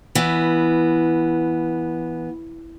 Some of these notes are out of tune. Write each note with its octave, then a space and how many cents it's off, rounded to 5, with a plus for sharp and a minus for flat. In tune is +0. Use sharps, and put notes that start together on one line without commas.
E3 +0 B3 -10